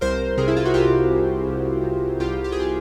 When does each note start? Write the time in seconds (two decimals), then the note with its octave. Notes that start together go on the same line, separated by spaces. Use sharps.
0.01 C2 A#4 C5
0.38 C3 G#4 A#4
0.48 E4
0.57 F4
0.65 F#4
0.74 C2 F4 G4
1.11 C2
1.48 C2
1.83 C3
2.20 C2 F4 G4
2.44 G4
2.52 G#4
2.60 F4 G4